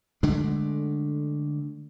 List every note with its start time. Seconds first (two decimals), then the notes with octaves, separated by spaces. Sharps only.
0.23 D3 G#3 A3 D4